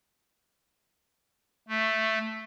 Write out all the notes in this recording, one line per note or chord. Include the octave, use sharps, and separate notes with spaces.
A3